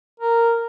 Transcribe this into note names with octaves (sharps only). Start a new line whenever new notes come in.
A#4